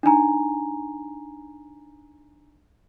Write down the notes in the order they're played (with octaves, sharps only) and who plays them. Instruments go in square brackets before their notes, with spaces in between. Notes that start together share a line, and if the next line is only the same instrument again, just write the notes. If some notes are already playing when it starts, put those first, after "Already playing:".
[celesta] D4 D#4 G#5 A#5